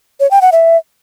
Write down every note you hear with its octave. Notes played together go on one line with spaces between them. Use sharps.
C#5
G5
F#5
E5